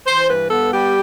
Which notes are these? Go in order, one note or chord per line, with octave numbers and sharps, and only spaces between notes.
E3 C5
G2 B4
B3 A4
G3 G4